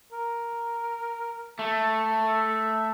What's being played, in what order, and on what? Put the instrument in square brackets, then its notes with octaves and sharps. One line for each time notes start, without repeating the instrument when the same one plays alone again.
[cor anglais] A#4
[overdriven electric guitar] A3 [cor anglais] E5
[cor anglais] E5